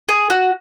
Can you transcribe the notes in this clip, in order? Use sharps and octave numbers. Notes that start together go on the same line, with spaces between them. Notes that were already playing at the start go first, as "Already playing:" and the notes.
G#4
F#4